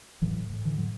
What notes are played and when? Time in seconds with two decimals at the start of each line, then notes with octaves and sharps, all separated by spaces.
0.22 A2 E3 F#3
0.50 A2
0.64 D3 E3
0.78 A2 F#3